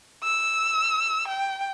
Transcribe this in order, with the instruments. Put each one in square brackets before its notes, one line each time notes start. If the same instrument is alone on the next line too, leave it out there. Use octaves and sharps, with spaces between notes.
[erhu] E6
G5